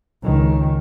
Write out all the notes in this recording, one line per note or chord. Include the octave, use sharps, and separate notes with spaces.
C#2 D#3